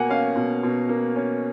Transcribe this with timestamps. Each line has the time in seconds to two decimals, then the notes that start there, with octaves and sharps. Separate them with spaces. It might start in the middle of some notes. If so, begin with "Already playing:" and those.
Already playing: B2 A#3 F#5 G#5
0.09 C#4 F5
0.36 B2
0.63 B2
0.89 A#3
1.16 C#4